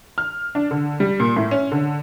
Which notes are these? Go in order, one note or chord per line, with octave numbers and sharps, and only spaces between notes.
F6
D4
D3
G3
A#2
A2
C#4
D3